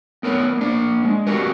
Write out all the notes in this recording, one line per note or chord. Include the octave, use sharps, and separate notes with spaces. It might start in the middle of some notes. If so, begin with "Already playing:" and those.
B3 A#4 B4 C#5
A#3 D4
G#3
C4 F#4 G4 A#4 B4